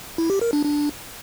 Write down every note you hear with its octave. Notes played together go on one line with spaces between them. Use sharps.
E4
G4
A#4
D4
D4